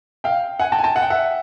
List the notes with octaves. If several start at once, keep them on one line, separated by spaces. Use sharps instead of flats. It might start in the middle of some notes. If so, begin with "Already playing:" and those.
F5 G5
F#5 G#5
G5 A5
G#5
G5 A5
F#5
G5
E5 F#5